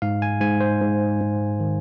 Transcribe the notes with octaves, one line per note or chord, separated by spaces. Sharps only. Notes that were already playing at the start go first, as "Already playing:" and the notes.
G#2 F5
G#5
G#2 G#5
C5
G#2
G#2
D#3